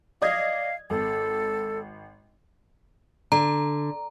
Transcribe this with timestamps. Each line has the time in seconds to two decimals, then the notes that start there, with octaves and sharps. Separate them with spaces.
0.22 D5 D#5 F5 G#6
0.90 G#1 A4
3.32 D3 A#5